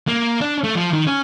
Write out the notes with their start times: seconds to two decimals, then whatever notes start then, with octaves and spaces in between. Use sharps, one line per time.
0.08 A#3
0.41 D4
0.64 A3
0.75 F3
0.93 D#3
1.07 C#4